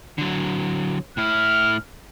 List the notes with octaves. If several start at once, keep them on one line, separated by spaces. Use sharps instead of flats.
D3 F#3
A2 E4 F6